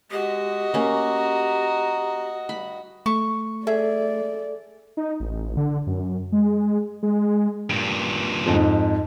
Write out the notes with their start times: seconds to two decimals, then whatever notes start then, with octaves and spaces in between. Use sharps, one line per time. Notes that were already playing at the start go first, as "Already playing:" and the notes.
0.11 G#3 F#4 G4 D#5
0.74 A#3 C#4 A#5
2.49 G2 B5
3.06 A3 C#6
3.67 G#4 A4 D5 E5
4.97 D#4
5.20 A1
5.57 D3
5.87 F#2
6.32 G#3
7.03 G#3
7.70 G2 A#2
8.46 F2 G#2